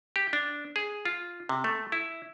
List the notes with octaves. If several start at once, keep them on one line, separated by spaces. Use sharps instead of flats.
G4
D4
G#4
F4
C3
A3
E4